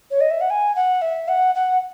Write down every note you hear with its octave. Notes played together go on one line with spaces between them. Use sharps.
C#5
D#5
E5
F#5
G#5
F#5
E5
F#5
F#5